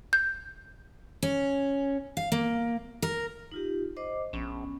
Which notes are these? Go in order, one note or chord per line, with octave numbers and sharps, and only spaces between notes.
G6
C#4
F5
A#3
A#4
D#4 F4 G4
C5 D#5 D6
A#1 B3 C#4